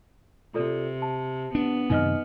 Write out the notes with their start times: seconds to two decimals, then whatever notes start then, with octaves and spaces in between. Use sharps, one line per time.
0.54 C3 F4 A4 D5
1.02 A5
1.55 B3 D4
1.90 F#2 C3 D#3 D#4 D#5 F6